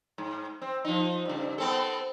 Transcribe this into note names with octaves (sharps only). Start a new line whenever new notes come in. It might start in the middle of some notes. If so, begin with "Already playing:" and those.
G#2
C4
F3 D#4
G2 C#3
B3 C4 A4